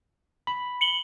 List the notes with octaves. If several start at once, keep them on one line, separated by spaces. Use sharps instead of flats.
B5
C#7 F#7 G7